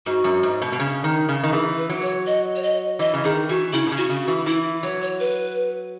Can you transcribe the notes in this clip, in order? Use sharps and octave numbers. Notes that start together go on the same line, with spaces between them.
G#2 F#4
F#2
G#2
B2
B2
C#3
D#3
C#3
D#3
E3 G#4
B4
F#3
C#5
D#5
C#5
D#5
E3 D#5
C#3
D#3 G#4
E3 F#4
C#3 E4
B2
C#3
F#4
C#3
F#4
E3
E3 E4
F#3 C#5
C#5
B4